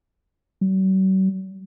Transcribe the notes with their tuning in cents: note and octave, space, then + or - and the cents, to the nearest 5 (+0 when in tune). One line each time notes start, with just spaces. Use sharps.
F#3 +45